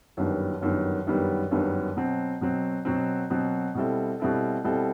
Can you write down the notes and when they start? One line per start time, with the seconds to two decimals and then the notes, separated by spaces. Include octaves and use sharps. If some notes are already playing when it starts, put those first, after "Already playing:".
0.17 G1 F#2 D#3 G3 B3
0.61 G1 F#2 D#3 G3 B3
1.06 G1 F#2 D#3 G3 B3
1.51 G1 F#2 D#3 G3 B3
1.96 B2 F#3 C4
2.41 B2 F#3 C4
2.85 B2 F#3 C4
3.30 B2 F#3 C4
3.75 B2 G3 C4 E4 A4
4.20 B2 G3 C4 E4 A4
4.64 B2 G3 C4 E4 A4